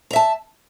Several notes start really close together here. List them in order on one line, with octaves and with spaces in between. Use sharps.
A#5 E5 A5